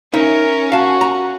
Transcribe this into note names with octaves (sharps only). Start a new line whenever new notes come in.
C#4 D#4 A#4 E5
F#4 F5 A5
A#5